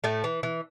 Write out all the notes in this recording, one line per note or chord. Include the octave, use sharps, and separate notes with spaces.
A2 A3
E3
E3